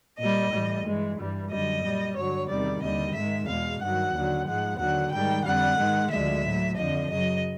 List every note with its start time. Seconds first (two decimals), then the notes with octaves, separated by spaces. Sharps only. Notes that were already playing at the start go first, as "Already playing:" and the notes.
0.19 A#2 G3 D#5
0.52 A2 E3 G3
0.85 G2 E3 G#3
1.18 G2 E3 G3
1.51 F#2 D3 G3 D#5
1.83 A#2 G3
2.16 G2 D3 F#3 C#5
2.49 E2 C3 D#3 G3 D5
2.82 D#2 D3 G3 D#5
3.15 G#2 D#3 G#3 E5
3.48 E2 B2 G#3 F5
3.81 G2 D#3 F#3 F#5
4.13 D#2 D3 F#3
4.47 G#2 F3 G#3 F#5
4.79 D#2 D3 F#3 F#5
5.12 G#2 D#3 G3 G5
5.45 F2 D3 G3 F#5
5.78 G#2 D#3 G#3
6.10 D2 D3 F3 G#3 E5
6.44 A2 F#3
6.76 F2 D3 F3 D#5
7.10 F#2 C#3 F#3 D#5